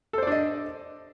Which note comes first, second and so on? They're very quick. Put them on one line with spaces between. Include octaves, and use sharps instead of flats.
A4 C5 D5 D4 D#5